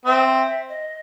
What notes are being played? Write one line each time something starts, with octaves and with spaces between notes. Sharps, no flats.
C4 E5
D#5